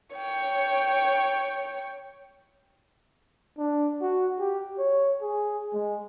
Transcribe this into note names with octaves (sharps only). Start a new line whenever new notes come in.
C#5 G5
D4
F#4
G4
C#5
G#4
G#3